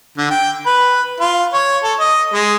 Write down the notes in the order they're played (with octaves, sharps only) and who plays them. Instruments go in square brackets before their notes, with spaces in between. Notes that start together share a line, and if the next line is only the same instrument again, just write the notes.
[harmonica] D3
G5
B4
F4
C#5
A4
D#5
G#3